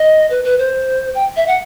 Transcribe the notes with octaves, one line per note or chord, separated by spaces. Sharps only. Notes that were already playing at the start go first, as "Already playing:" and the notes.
Already playing: D#5
B4
B4
C5
G5
E5
F#5